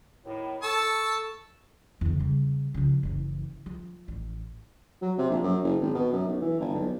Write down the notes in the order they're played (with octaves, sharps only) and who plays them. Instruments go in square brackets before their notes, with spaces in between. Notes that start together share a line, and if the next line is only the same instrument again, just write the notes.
[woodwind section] D#2 A2
[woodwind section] A4 [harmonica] A5 C#6 E6
[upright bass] E2 D3
C#3 G3
C#3 F3
F#1 E3
F3
A1
[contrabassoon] F#3
C3
A#1
F#2
F#1
G#1
B2
F#2
B1
E3
G1
B1